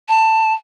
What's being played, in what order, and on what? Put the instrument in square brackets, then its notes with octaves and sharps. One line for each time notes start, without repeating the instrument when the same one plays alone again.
[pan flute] A5